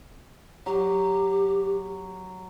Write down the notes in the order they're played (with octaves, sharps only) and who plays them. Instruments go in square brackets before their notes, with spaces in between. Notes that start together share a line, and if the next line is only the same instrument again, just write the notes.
[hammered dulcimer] F#3 [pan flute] G4